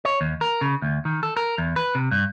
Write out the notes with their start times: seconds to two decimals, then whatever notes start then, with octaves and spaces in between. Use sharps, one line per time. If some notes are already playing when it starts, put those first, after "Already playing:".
0.05 C#5
0.21 D#2
0.41 A#4
0.61 C#3
0.82 D2
1.05 D#3
1.23 A4
1.37 A#4
1.58 E2
1.76 B4
1.95 C3
2.11 G2